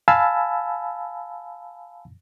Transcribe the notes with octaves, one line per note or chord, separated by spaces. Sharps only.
F5 G#5 A5 B5 E6